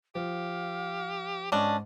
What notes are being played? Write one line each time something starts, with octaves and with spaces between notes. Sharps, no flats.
F3 G4 F5
G#2 G3 C#4 D4 D#5